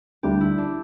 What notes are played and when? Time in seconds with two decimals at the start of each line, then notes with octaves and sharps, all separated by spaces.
0.23 D2 D3 G3 D4 G4
0.41 E4
0.58 D4